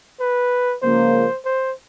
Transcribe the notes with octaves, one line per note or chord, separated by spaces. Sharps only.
B4
C#2 C#3 F3 A#3 C5
C5